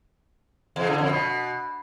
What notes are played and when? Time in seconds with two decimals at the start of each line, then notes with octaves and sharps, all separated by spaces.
0.76 E2
0.87 D3
0.98 F2
1.09 B2